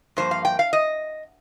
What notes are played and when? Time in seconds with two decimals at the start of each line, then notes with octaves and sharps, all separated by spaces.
0.17 G2 F3 A#3 C5
0.31 F5
0.45 G5
0.59 F5
0.73 D#5